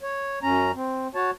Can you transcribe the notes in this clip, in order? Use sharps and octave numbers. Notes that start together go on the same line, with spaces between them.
C#5
F#2 C#4 A#5
C4
F#4 C#5 A5